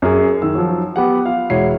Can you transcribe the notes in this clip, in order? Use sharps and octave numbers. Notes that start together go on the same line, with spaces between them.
F#2 G#4
D#3 E6
F3 F#3
B3 G4 F#5
F4 F5
E1 G#3 E4 F#4 C#5 C7